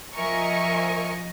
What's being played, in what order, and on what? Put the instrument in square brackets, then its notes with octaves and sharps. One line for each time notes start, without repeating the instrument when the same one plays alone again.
[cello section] F3 D#5 [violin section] A#4 G#5 C#6 [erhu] E5